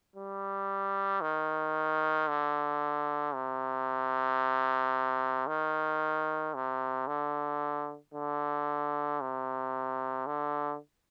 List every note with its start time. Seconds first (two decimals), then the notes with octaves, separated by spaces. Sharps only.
0.16 G3
1.21 D#3
2.28 D3
3.34 C3
5.47 D#3
6.54 C3
7.07 D3
8.14 D3
9.21 C3
10.27 D3